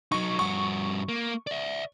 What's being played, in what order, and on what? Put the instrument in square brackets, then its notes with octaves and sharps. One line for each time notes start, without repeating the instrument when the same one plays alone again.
[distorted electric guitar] F#3 D#4 [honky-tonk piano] C#6
[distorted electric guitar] G2 F#4 [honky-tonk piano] C#6
[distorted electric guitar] A#3
D5 E5